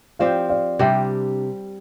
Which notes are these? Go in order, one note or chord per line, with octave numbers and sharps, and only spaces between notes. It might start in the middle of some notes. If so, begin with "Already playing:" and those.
F3 C4 G4 D5 F5
D5 F5
C3 G3 D4 E5 G5